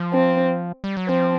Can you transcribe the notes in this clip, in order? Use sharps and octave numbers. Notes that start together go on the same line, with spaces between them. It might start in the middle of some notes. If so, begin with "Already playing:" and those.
Already playing: F3
C4
G3
F#3
F3 C4